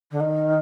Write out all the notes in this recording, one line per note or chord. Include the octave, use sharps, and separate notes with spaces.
D3
D#3